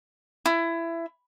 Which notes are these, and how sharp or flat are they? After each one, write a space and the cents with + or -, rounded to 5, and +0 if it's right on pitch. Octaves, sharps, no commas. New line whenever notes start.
E4 +20